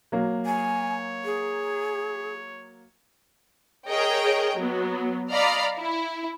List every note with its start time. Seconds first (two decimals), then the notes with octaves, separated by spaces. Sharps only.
0.12 F#3 A#3
0.46 C#5 G#5
1.25 G#4
3.88 G#4 A#4 C#5 D#5 G5
4.56 F#3 B3
5.31 D5 D#5 F5 A#5 B5 F6
5.78 E4